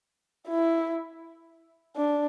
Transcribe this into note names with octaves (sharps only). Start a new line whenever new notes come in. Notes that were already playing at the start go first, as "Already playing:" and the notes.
E4
D4